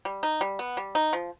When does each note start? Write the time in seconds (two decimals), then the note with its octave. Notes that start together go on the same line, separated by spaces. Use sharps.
0.05 G3
0.23 D#4
0.41 G3
0.59 B3
0.77 G3
0.95 D#4
1.13 F3